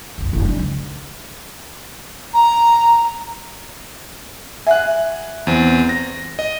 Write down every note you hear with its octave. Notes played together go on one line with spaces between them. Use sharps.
F1 B1
F1 D#2
F#3 D4
C#2
A#5
E5 F#5 G#5 F#6
E2 C4
A#6
D#5